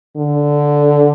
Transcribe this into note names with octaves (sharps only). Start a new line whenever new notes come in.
D3